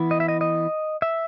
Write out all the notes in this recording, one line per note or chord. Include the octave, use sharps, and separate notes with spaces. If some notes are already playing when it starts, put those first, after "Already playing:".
Already playing: E3 B3 E4
D#5
E5
D#5
D#5
E5